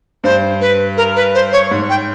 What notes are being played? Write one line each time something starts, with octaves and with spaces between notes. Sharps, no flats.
G2 C5
B4
A#4
B4
C5
C#5
G#2
G5